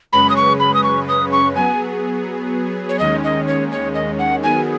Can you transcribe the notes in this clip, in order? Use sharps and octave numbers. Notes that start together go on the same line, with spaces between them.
F#2 C#3 G#3 C#4 B4 B5
D#6
C#6
B5
D#6
C#6
D#6
C#6
F#3 B3 G#4 G#5
C#5
D#2 D#3 G#3 C#4 D#5
D#5
C#5
C#5
D#5
F#5
D#3 F#3 B3 G#4 G#5